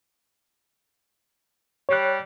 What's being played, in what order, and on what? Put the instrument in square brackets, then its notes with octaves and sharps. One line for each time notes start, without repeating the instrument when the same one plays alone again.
[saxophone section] G3 [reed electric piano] C#5 F#6